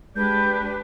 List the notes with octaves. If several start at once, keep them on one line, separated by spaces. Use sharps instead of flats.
G#3 D4 G4 B4 G6